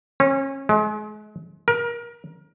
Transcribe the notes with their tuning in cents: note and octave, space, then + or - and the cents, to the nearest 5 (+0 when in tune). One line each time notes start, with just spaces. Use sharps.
C#4 -30
G#3 +35
A#4 +25